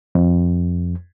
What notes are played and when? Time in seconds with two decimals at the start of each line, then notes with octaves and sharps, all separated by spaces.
0.15 F2